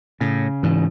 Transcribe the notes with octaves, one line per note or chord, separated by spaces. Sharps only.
A2 C#3
G#2 E3